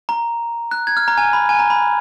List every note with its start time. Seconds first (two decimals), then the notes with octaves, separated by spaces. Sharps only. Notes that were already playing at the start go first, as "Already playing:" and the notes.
0.09 A#5
0.71 F#6
0.87 G#6
0.97 F6
1.08 A#5
1.18 G#5
1.33 B5
1.49 G#5
1.59 A#5
1.70 B5